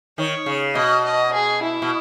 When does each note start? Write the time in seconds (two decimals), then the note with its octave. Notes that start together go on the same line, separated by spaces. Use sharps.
0.17 D#3 C#5
0.46 C#3
0.75 B2 D#5
1.04 D#5
1.33 G#4
1.62 E4
1.82 B2